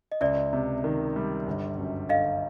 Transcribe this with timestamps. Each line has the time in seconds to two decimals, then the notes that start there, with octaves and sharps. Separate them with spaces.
0.12 D#5
0.21 C#2 D5 E5
0.53 C3
0.84 D#3
1.16 G3
1.47 G1
1.78 F#2
2.09 D3 D#5 F5